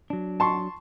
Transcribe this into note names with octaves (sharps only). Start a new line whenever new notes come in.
F#3 D4
A5 C6 C#6